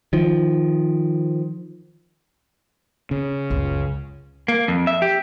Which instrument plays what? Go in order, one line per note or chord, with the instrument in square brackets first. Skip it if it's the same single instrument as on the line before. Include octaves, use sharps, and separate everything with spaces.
[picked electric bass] D#3 F3
[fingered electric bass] C#3
[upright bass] C#2 F#2
[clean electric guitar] A#3
F2
E5
G4